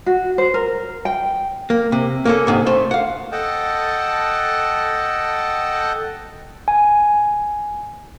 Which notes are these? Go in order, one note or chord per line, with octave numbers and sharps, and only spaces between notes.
F#4
C5
A#4
G5
A#3
C3
A#3 C#4 A4
G#2 C3 D#3
A3 C5
F5 F#5
A4 D#5 F#5 G5 A5
G#5